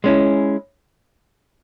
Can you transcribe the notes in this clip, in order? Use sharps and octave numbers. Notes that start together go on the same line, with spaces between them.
G#3 C#4 E4